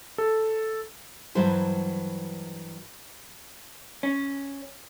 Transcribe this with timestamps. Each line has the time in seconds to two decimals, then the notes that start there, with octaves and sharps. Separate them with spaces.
0.18 A4
1.35 G2 E3 F#3 E4 C5 A5
4.03 C#4